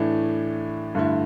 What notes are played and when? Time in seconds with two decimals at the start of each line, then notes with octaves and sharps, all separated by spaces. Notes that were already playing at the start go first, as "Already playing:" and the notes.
Already playing: A2 E3 A3 D4
0.95 G2 D3 A3 E4